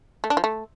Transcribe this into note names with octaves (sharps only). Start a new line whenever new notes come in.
A3
D4
F3
A3